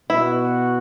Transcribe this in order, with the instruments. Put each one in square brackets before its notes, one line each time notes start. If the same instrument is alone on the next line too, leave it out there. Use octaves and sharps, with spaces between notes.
[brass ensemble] B2 B3 F#4 [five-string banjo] E4